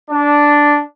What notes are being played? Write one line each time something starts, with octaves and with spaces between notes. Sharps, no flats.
D4